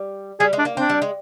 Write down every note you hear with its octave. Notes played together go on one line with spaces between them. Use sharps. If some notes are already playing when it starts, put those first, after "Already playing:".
Already playing: G3
G3 G#4
G#3
D4
A#3
C4 D4
G3
G#3